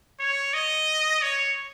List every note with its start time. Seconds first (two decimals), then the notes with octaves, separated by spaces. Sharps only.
0.20 C#5
0.54 D#5
1.22 C#5